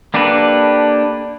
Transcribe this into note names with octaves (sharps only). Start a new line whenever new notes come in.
A#3 D4 G4 A4 B4